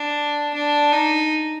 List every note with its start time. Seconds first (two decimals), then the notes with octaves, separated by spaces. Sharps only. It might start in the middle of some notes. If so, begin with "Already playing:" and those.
Already playing: D4
0.55 D4
0.92 D#4